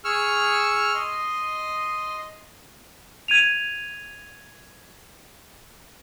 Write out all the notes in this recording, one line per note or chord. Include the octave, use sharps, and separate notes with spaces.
G#4 C#6 E6 F6
D#5 C6
G#6 D#7 F7